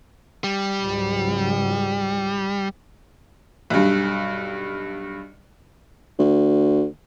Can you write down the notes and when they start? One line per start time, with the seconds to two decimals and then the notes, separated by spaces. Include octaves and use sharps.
0.44 G3
0.80 C#2 G#2 F#3
3.70 B1 G2
6.19 D2